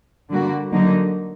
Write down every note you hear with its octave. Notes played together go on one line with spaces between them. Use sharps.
D3 G3 A#3 F#4
D3 F#3 A#3 D#4